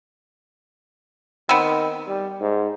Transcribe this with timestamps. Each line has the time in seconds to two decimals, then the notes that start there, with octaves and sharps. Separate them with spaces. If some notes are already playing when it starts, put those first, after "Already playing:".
1.49 D#3 B3 C4
2.07 G3
2.41 G#2